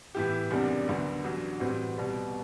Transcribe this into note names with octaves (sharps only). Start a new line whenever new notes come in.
A2 E3 B3 E4 G4
F#1 E2 C3 G3 D4
D2 D3 F#3 B3 F#4
A1 G2 F#3
A2 E3 G3 C4 F#4
C2 B2 G3 B3